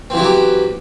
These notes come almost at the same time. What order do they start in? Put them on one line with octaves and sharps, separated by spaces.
C4 E3 E4 F#3 G4